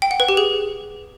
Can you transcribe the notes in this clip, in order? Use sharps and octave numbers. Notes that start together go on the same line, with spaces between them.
G5
F#5
B4
G4
G#4